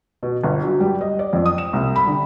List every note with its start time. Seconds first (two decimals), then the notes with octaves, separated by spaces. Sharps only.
0.23 B2
0.44 G1
0.63 F#3
0.80 G3
1.01 D#5
1.19 D5
1.33 F2
1.46 D#6
1.58 E7
1.73 C2
1.96 B5
2.07 D3